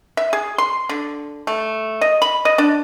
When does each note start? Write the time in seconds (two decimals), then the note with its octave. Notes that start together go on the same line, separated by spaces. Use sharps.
0.17 E5
0.33 G#4
0.58 C6
0.89 D3
1.47 A3
2.01 D#5
2.22 B5
2.45 D#5
2.58 D4